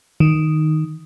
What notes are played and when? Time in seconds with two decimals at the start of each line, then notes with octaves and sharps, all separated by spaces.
0.20 D#3